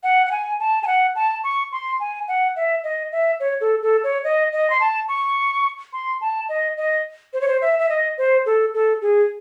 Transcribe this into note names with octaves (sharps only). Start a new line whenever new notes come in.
F#5
F#5
G#5
A5
G#5
F#5
A5
C#6
C6
G#5
F#5
E5
D#5
E5
C#5
A4
A4
C#5
D#5
D#5
C6
A5
C#6
C6
A5
D#5
D#5
C5
C#5
C5
E5
E5
D#5
C5
A4
A4
G#4